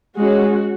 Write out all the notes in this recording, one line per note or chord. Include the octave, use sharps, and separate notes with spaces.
G#3 C#4 F#4